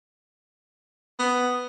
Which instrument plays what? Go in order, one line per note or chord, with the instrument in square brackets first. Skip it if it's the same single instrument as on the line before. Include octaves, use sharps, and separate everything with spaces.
[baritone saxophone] B3